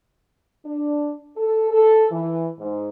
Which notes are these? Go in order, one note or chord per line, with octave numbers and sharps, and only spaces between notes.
D4
A4
A4
E3
G#2